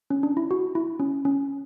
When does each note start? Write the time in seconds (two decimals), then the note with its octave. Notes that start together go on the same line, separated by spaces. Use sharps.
0.10 C#4
0.23 D4
0.37 E4
0.51 F#4
0.75 E4
1.00 C#4
1.25 C#4